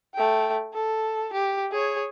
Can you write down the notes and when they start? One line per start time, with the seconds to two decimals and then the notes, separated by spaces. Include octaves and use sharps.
0.14 A3 G5
0.74 A4
1.33 G4
1.72 G#4 C#5